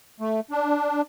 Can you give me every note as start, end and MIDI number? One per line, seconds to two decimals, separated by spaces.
0.20 0.40 57
0.51 1.02 62